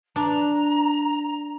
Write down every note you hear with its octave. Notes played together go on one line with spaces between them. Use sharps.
D4 A#5